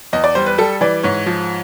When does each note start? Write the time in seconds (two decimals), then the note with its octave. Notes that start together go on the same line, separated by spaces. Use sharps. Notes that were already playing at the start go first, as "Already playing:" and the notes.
0.13 E2 D#5
0.24 D5
0.35 G3 C5
0.46 B4
0.58 G3 A4
0.81 E3 D5
1.03 G#2 C#5
1.26 F3